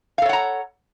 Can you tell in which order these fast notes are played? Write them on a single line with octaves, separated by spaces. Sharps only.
F5 A4 C#5 F#5 A#5